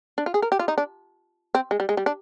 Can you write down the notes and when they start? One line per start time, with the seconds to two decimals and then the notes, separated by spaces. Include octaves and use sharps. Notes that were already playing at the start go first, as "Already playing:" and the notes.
0.18 D4
0.26 F4
0.34 G#4
0.42 A#4
0.52 G4
0.59 F4
0.68 D#4
0.78 D4
1.55 C4
1.71 G#3
1.80 G3
1.89 G#3
1.97 G3
2.06 D4